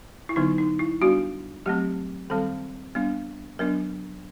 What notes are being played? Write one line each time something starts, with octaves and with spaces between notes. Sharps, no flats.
E4
D3 F#3 B3 D#4
D#4
E4
G3 B3 D4 F#4
F#3 A3 C4 G4
D#3 G3 C4 A4
G3 B3 D4
F#3 B3 D4 A#4